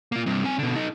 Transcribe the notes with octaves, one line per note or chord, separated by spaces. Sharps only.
A#3 F4
G2 C3
C4 G#5
B2 D3
D#4 A4